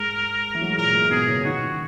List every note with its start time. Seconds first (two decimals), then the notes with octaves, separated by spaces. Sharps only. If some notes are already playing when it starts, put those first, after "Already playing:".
Already playing: G#2 G#3 A#4
0.55 E3
0.62 F#3
0.70 G#3
0.77 A#2 A#3 A#4
0.94 G#2 G#3
1.10 B2 B3 G#4
1.28 C#3 C#4
1.45 D#3 D#4 F#4